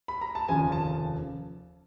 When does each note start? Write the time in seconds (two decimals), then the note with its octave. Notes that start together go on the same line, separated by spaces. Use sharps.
0.08 B5
0.21 A#5
0.35 A5
0.49 F1 D#2 C#3 F3 G#5
0.72 A5